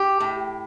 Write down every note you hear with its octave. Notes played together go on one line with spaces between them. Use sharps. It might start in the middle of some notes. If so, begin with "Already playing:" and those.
Already playing: G4
A2